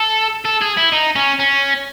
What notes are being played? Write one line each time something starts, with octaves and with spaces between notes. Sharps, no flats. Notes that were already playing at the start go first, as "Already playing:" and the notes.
Already playing: A4
A4
G#4
E4
D#4
C#4
C#4